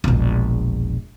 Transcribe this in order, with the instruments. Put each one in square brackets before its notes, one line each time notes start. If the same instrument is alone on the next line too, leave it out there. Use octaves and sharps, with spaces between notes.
[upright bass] E1 A#1